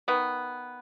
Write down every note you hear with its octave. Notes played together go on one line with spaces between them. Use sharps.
D#3 B3